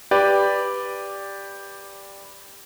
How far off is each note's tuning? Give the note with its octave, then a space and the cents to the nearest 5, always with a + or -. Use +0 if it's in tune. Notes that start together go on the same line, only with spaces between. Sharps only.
G4 +10 B4 +0 D5 +0